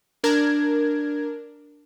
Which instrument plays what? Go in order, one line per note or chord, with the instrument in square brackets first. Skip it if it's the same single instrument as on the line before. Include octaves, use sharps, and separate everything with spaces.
[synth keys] D4 A#4 G#6